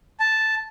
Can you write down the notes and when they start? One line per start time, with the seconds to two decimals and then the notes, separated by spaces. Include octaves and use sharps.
0.20 A5